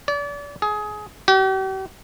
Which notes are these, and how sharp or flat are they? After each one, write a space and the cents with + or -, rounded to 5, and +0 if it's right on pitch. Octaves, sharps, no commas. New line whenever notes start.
D5 -35
G#4 +20
G4 -45